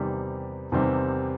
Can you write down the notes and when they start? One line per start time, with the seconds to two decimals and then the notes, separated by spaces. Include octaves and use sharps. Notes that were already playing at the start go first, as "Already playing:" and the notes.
Already playing: E2 C3 D#3 G3 C4
0.72 E2 C3 D#3 G3 C4